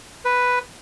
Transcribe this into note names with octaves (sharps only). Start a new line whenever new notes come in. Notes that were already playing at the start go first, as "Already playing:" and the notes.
B4